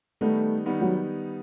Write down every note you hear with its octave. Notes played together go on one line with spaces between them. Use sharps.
D#3 G3 A3 B3 D#4
D#3 G3 B3 D#4
F#3